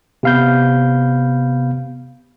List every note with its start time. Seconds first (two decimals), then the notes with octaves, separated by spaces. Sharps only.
0.23 C3 B3 F5 B5 G6